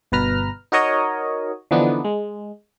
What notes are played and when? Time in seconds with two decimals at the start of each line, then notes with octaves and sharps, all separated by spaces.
0.12 G1 B2 B4 A#5 F6
0.72 D#4 F#4 A#4 C#5 D#5
1.71 D3 E3 F3 B3 D4 D#4
2.04 G#3